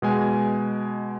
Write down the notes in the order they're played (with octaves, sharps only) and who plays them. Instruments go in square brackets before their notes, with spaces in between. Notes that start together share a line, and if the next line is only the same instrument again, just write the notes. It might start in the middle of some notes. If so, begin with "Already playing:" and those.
[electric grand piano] B2 G#3 G#5